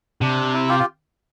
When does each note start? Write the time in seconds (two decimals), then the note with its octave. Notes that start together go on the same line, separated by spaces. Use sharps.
0.21 C3 D4
0.53 E4
0.69 F4 G4
0.79 F4